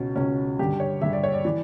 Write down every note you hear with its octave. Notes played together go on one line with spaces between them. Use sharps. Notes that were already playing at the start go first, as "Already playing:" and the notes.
Already playing: C#2 B2 C#4
C#2 B2 C#4
G2 D3 G4
C#5
G2 D3 E5
D5
C#5
D5
E3 D5